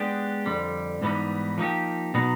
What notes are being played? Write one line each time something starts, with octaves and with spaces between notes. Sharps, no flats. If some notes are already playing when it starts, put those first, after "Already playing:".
Already playing: G#3 B3 D4 G4
F2 D3 G3
G#2 E3 G3 B3 D#4
F3 A#3 D#4 G4
B2 F#3 B3 D#4